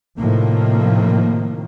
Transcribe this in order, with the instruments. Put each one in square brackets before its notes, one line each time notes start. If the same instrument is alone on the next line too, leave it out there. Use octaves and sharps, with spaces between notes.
[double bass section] A2 C3 D#3 F3 A#3